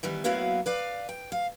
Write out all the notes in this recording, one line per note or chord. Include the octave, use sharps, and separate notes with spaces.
D#3 E3 G3 B3
F#3 A#3 B3 E4 F#4 F5
B4 D5 F5
G5
F5